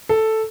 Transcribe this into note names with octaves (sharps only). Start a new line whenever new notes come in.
A4